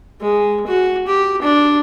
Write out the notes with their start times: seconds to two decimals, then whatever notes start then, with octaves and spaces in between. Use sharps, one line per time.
0.21 G#3
0.67 F#4
1.08 G4
1.42 D4